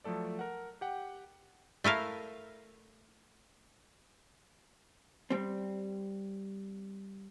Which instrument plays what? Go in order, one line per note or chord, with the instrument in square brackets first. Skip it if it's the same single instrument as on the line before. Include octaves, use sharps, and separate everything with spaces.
[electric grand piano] F3 F#3 A3 A4 D5
A#4 F#5
G4 F#5 G5
[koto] A3 E4 A#4 F5
[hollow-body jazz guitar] G3 C4